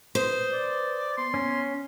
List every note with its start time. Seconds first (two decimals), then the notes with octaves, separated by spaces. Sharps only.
0.15 B4 C5 D#6
0.52 D5
1.17 B3 C6
1.34 C#4